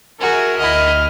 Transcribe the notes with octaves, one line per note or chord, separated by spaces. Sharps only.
F#4 G#4 A#4 E5
D2 E4 D#5 F6